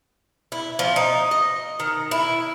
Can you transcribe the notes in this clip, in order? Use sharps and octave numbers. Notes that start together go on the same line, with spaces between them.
E4
F3
D#4
D#5
D#3
E4